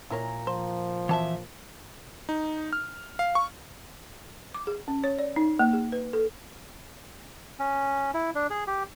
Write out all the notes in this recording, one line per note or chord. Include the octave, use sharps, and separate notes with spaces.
A#2 E4 A#4 C#5 A#5
F3 C5
E3 C4 F#4 E5 A5
D#4
F6
F5
C#6
D6
G#4
C#4
C#5
D5
D#4
A#3
G#4
B4
A4
C#4
E4
D4
G#4
G4